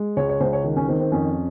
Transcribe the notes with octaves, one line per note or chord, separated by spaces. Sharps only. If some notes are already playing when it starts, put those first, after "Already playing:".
Already playing: G#3
C#2 C#5
C#5
C#2 C5
C#5
D#3
C#4
D#3 C4
C4
F2 C#4